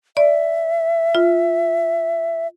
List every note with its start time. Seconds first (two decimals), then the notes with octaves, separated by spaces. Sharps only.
0.17 D5 E5
1.15 F4